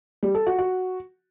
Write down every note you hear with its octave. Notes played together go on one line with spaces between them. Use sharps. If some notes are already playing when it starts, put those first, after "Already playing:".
G3
A4
F#4
F#4